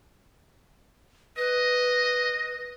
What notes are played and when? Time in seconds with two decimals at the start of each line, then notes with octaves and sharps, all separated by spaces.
1.37 B4 D#5